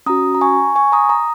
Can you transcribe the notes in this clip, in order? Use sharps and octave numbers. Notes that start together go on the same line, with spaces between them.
C#4 F#4 A#5 D#6
A#5
G#5 C#6
G#5 C#6
A#5 D#6
A#5 D#6